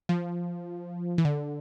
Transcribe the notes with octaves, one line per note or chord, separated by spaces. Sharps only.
F3
E3
D3